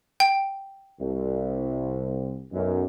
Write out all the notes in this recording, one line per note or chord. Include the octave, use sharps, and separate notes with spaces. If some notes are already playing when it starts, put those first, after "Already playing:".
G5
C2
B1 F#2